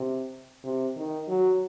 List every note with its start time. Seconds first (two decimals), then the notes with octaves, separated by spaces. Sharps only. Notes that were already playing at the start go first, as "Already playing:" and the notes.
Already playing: C3
0.64 C3
0.96 D#3
1.28 F#3